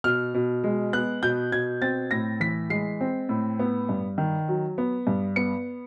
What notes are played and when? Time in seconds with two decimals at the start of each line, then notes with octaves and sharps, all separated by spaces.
0.04 B2 F6
0.34 B2
0.64 G#3
0.93 B3 F#6
1.22 B2 G6
1.52 B2 G#6
1.82 C4 A6
2.11 A2 A#6
2.40 E3 B6
2.70 G#3 C7
3.01 C4
3.29 A2
3.59 B3
3.89 G2
4.18 D#3
4.48 F#3
4.78 B3
5.07 G2
5.36 B3 C#7